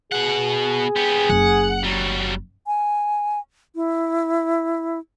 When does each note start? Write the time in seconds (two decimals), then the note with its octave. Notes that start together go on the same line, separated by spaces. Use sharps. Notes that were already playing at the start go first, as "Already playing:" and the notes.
0.12 B2 G#4 F#5
0.96 B3 G4
1.30 F#1 F#5
1.83 F#3 G3
2.67 G#5
3.75 E4